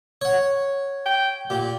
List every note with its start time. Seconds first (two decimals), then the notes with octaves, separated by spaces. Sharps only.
0.21 C#5 F#5
1.06 G5
1.50 A#2 G4